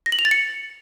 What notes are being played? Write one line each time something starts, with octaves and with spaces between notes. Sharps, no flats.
A#6
F#7
F7
A6
C#7